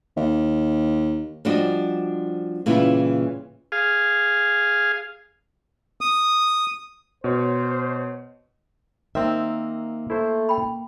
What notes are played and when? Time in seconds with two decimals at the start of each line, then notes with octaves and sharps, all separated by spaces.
0.17 D#2
1.45 F3 G3 D4 F#4 D#5
2.66 A#2 C#3 E3 G3 E4 F4
3.72 G#4 F5
6.01 D#6
7.24 B2 C5 C#5
9.15 D#3 A#3 C4 E5
10.10 A3 E4 C5
10.49 G5 B5